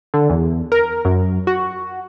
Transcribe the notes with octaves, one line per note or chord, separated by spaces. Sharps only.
D3
E2
A#4
F#2
F#4